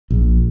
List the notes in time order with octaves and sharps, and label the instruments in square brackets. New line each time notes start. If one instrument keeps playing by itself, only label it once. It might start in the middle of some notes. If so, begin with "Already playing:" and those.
[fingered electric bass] A#1